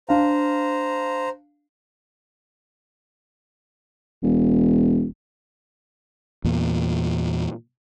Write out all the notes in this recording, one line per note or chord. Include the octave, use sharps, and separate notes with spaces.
D4 C5 F5 A#5
E1
E2 A#2